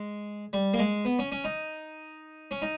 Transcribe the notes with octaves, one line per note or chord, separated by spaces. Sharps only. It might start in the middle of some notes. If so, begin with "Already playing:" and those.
Already playing: G#3
G3
A#3
G#3
B3
C#4
C#4
D#4
C#4
D#4